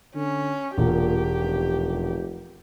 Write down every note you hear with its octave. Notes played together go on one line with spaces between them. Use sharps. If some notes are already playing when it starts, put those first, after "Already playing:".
D3 C#4
E1 A#2 G4
F1